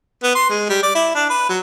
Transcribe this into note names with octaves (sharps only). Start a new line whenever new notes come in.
B3
C6
G#3
G3
D5
E4
D4
B4
F#3